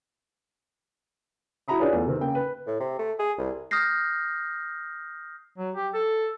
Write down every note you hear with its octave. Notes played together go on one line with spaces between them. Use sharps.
E4 F#4 E5 A#5 B5 D#6
D4 F4 G#4 B4 C#5
E2 A3
C3 D#3 C4
C#3 A#3 G5
B4
A2
C3
A3
G#4
C2
D#6 F6 G6 A#6 C7
F#3
G4
A4